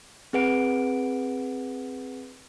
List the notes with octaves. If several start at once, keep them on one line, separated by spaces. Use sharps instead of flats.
C4 G#4 B4 F#5 D7